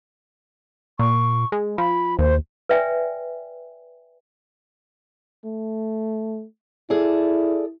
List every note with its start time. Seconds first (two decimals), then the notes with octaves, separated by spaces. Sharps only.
0.99 A#2 C#6
1.52 G#3
1.78 F3 B5
2.19 D#2 C5
2.69 B4 D5 E5 G5 G#5
5.45 A3
6.90 E4 G#4 A4 D5